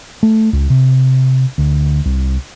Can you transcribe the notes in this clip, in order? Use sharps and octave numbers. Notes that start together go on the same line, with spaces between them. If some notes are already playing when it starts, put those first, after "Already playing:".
A3
C#2
C3
D2
C2